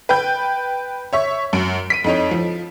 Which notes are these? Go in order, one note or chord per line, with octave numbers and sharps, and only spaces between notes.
B4 G5 G6
C#5 E5 C#6
F#2 D7
B6 D7 D#7
F2 D#4 C#5
F3